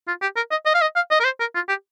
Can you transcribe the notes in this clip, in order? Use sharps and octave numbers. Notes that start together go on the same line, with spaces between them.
F4
G4
A#4
D#5
D#5
F5
D#5
F5
D#5
A#4
C5
A#4
F4
G4